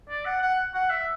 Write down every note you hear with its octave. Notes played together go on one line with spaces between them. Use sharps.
D5
F#5
F#5
F#5
E5